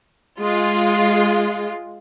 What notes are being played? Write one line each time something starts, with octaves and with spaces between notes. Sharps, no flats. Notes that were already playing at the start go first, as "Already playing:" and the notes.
G#3 F4